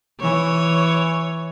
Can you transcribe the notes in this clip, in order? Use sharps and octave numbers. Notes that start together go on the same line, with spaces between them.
E3 C#5